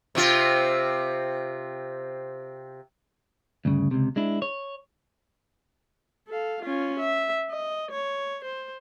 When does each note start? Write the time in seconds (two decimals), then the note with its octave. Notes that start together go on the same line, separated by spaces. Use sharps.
0.15 C3 C4 F4
3.65 D2 G2 C#3
3.91 C#2 C3
4.16 G#3 D4 E4
4.42 C#5
6.28 A4 F5
6.63 C#4 F4
7.00 E5
7.50 D#5
7.91 C#5
8.45 C5